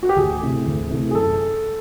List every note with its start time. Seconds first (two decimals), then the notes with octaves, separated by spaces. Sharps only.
0.03 F#4
0.09 G4
0.16 D2 G#4
0.42 C3 E3 A3
0.66 D2
0.90 C3 E3 A3
1.11 G#4
1.15 F#2 A4